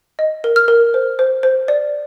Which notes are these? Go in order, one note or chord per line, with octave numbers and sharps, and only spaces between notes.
D#5
A#4
F6
A#4
C5
C5
C5
D5